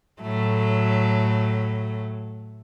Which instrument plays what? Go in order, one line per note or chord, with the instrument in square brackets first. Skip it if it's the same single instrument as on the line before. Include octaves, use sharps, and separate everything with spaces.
[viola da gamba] A2 F#3 A3